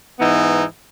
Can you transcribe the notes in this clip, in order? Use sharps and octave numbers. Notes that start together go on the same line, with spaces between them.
G#2 E3 B3 D#4